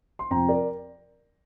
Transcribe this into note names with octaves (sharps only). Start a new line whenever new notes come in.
C6
F2 C3 F3 G5 A#5
A#4 D5